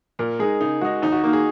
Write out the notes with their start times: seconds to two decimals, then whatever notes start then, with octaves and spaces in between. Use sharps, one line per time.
0.19 A#2 A#4
0.39 G#3 D#4 G#4
0.61 C#3 D#4
0.81 G#3 D#4 F#4
1.02 D#2 D#4
1.12 F#4
1.23 D#3 A#3 D#4
1.33 G#4